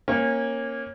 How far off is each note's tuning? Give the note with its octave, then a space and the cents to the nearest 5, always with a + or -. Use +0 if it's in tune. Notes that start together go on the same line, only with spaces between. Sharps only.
A#3 +0 C#4 -25